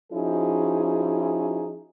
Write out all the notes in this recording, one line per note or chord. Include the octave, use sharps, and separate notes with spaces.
F3 C#4 D#4 E4 F#4 G#4